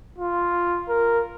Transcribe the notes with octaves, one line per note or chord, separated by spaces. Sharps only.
F4
A#4